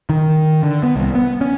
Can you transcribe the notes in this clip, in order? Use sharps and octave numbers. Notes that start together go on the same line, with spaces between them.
D#3
D3
B3
C2
B3
C#4